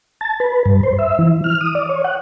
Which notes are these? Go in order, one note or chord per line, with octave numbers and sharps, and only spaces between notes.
A5
B4
G2
C5
E5
E3
F6
D#6
D5
C#5
F#5